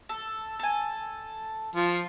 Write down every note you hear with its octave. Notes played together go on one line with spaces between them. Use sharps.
A4
A4 G#5
F3